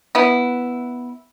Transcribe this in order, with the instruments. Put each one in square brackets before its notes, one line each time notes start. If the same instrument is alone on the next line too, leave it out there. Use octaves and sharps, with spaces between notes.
[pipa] B3 E4